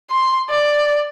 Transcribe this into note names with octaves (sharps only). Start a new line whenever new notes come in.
C6
D5